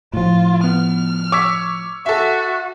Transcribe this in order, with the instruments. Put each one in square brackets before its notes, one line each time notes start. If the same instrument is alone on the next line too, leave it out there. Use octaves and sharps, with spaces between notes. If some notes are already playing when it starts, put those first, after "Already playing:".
[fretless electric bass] A2 F3 [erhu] F4
[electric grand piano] B3 [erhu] F6
[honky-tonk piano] C#5 [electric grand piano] D6 E6 B6
[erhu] F#4 [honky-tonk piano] A4 E5